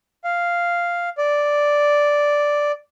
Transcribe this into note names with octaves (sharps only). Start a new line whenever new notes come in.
F5
D5